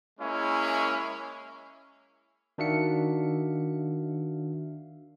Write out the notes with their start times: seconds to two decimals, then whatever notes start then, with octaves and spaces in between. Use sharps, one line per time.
0.20 G#3 A#3 C#4 E4
2.58 D#3 D4 F#4 E5 F5 C#7